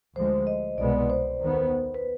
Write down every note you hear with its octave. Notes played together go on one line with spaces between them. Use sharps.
D2 D3 F3 G#3 C5
D#5
C2 B2 G#3 B3 D5
C5
D#2 D#3 B3
B4